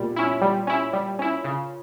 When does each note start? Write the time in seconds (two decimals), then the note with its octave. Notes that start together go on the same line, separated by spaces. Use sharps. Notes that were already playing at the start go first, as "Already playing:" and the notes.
Already playing: A#2 G3
0.16 C#4 E4
0.42 G3
0.67 C#4 E4
0.93 G3
1.19 C#4 E4
1.44 C#3